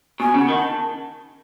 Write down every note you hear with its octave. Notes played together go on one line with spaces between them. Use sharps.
B2 G#5
C#3
F#5
D#3
A5